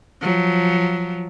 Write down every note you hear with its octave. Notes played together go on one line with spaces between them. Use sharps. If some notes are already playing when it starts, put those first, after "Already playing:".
F3 F#3